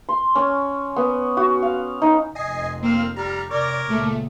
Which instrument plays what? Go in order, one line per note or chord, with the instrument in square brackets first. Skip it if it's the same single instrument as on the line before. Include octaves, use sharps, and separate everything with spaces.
[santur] C6
C#4
B3
F#4
F5
D#4
[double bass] F1 F2 [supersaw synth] D#5 G#5 C7
[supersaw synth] A#3 F6 [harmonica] C4
[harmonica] G3 [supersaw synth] A#5 F6
[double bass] C3 [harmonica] A#4 C#5 D6 [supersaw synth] D5
[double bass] C#2 A#2 [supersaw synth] A3